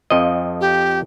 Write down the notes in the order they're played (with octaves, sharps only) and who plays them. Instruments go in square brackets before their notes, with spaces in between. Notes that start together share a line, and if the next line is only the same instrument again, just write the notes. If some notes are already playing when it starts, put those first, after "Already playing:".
[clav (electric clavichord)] F2 F3 D#5
[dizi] G4